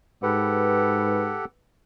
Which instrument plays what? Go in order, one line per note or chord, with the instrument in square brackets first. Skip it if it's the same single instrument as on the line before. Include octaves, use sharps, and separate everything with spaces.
[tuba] G#2 [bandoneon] G4 A4 F#5 [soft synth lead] B4